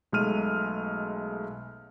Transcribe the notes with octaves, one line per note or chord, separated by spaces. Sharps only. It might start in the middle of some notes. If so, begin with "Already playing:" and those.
B1 G#3 A3 F6 D#7